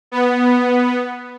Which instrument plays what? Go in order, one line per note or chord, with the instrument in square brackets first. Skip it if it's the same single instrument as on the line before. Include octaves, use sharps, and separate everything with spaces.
[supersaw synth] B3